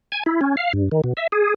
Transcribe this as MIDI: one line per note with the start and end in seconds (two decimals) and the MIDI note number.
0.12 0.23 80
0.26 0.40 64
0.41 0.56 61
0.57 0.72 77
0.73 0.89 43
0.92 1.01 51
1.04 1.13 47
1.17 1.27 76
1.32 1.54 68